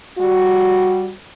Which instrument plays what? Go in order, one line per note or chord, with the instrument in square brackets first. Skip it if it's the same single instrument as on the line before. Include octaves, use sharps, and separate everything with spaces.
[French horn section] G3 F#4